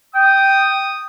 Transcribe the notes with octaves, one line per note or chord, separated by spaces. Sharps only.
G5 D#6